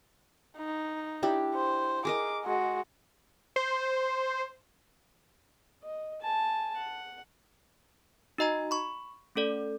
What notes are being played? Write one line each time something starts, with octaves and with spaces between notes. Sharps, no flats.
D#4
D4 E4 G4
C5
G#4 A#4 D#5 D6
G#3 F#4
C5
D#5
G#5 A5
F#5
D#4 F#4 D#5 A#5 G#6
B5 C#6
A3 C#4 A4 D5